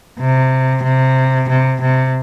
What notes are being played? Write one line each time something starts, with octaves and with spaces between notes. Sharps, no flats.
C3
C3
C3
C3